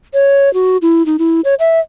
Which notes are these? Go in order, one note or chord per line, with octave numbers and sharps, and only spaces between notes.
C#5
F#4
E4
D#4
E4
C#5
E5